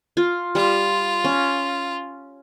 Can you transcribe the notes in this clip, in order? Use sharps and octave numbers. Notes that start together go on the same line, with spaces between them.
F4
G3 F4
C#4